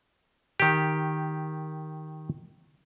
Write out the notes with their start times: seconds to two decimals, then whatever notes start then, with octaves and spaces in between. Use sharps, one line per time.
0.60 D#3 G4